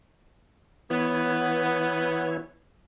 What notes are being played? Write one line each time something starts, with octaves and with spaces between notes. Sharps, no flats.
E3 B3 E4 C#5